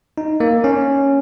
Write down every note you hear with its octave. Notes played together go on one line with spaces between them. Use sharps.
D#4
A#3
C#4